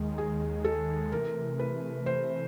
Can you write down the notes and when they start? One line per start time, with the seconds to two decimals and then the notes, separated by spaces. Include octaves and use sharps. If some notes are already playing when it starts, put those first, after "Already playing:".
Already playing: D#2 D#3 G#3
0.18 G#4
0.65 A4
1.12 C3 E3 A3 A#4
1.59 B4
2.06 C5